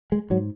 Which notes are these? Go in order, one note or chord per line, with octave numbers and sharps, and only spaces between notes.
G#3
G#2 F#3